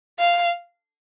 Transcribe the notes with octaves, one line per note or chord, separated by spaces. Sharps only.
F5